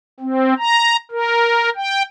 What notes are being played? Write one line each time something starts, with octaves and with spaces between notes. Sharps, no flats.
C4
A#5
A#4
G5